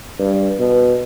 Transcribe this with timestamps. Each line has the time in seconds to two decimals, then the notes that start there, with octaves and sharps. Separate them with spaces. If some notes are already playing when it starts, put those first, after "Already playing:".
0.19 G2
0.59 B2